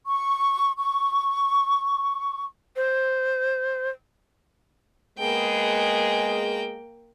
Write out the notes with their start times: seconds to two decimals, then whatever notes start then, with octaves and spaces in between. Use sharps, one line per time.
0.05 C#6
0.77 C#6
2.76 C5
5.18 G#3 A#3 B3 G#4 G5